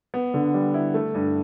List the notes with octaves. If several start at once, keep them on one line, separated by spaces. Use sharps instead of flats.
B3
D3
G3
E4
A3
G2